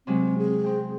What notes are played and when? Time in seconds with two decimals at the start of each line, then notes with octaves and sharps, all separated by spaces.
0.07 C3 F#3 G#3 C4
0.38 G#4
0.64 C4 G5